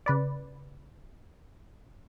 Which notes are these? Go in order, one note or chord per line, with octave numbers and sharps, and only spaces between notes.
C#3 B4 D5